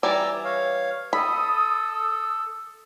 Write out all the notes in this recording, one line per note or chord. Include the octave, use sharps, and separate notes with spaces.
E3 G3 D5 G#5 A#5 E6
C#5 F5
A4 B5 D#6